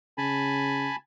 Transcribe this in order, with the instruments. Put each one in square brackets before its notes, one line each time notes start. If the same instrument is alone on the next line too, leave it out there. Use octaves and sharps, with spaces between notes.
[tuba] C#3 [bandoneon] G#5 A5 B5